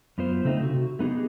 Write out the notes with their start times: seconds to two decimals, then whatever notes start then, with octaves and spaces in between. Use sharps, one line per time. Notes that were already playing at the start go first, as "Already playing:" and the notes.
0.18 F#2 B3 F4 C5
0.45 C#3 A3 C4 D#4
0.61 C3 F#4
0.99 A3 B3 D#4 G4 G#4